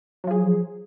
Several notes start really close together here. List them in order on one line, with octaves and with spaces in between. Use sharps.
F#3 F3 G#4